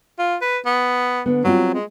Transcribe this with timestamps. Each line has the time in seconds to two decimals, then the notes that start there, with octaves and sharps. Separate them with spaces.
0.19 F4
0.41 B4
0.66 B3
1.26 D3 B3
1.45 F#3 G3 C4 F4
1.74 G#3